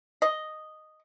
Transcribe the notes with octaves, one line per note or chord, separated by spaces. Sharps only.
D#5